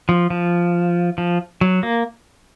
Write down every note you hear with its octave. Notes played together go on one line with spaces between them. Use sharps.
F3
F3
F3
F#3
A#3